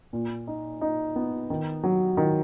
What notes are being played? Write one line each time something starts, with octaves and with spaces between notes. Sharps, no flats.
A#2
D#4
D#4
B3
D#3
F#3
D#3